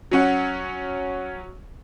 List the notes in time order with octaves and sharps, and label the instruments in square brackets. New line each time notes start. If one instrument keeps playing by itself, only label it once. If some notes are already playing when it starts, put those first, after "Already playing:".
[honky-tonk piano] F#3 C#4 F#5